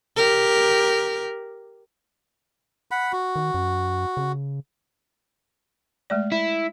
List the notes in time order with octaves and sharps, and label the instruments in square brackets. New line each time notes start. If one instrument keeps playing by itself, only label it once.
[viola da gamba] G4 A#4
[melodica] F#5 B5
F#4
[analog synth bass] D#3
F#2
C#3
[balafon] G#3 A3 D5
[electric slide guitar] E4